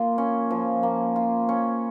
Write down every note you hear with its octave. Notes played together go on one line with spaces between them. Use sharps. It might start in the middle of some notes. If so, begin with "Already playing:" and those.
Already playing: A#3 F4
C#4
F3
A#3
F4
C#4